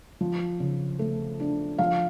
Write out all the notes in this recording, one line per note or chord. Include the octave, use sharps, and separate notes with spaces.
F3
C#3
A3
D4
F3 F5